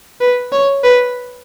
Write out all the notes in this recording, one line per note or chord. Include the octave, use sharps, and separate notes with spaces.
B4
C#5
B4